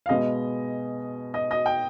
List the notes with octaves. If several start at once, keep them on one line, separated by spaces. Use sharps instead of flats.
F5
B2 G#3 B3 D#5
D#5
D#5
G5